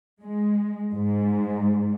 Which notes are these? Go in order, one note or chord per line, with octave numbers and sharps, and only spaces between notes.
G#3
G#2